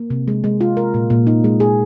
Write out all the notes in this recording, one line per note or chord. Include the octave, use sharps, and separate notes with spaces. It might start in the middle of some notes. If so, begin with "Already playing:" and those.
Already playing: A#3
C3
G#3
G#3
F4
A#4
A#2
A#2
D#4
G#3
G#4